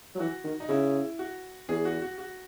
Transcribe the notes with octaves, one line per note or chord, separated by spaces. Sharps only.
F#3
E3 F#4
D#3
D#4
C#3 E4
F#4
E2 G#4
F#4
F#4
F#4